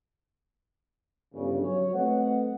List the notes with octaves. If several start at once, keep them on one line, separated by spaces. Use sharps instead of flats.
G1 C#3
F#3 C#5
A3 C4 B4 D#5 F#5